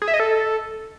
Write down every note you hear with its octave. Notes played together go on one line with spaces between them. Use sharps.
G#4
E5
D#5
A4